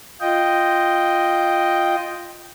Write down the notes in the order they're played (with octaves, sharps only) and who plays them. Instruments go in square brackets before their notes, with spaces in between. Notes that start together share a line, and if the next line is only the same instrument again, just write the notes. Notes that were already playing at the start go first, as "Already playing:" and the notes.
[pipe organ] F4 D#5 G5